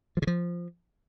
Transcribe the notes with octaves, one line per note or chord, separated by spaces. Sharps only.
F3
C#3
F3